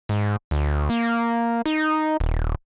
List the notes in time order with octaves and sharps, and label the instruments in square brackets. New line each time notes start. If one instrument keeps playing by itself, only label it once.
[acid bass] G#2
D2
A#3
D#4
D#1